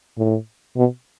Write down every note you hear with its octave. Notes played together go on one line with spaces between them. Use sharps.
A2
B2